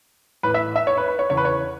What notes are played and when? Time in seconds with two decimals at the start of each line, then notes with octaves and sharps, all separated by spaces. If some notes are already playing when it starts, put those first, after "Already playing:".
0.43 A2 E3 B4
0.54 E5
0.76 E5
0.87 C#5
0.97 B4
1.08 B4
1.19 C#5
1.30 E2 C#3 E3 C#5
1.37 B4
1.45 C#5